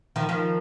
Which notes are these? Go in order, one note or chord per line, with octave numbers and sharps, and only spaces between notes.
D#3 F3
D#3 F3